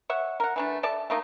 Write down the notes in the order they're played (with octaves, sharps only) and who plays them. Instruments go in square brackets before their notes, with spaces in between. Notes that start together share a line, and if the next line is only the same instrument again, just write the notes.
[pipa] C#5 E5 F#5
A#4 F#5
E3 A3 D4
A4 D5 E5 A5
A3 A#3 D#4